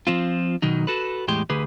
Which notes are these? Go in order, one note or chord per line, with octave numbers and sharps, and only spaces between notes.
F3 C4 F4
B2 D#3 F#3 D#4
F#4 A4 B4
E2 A2 G#3 G4 C6
D2 G4 G#4 B4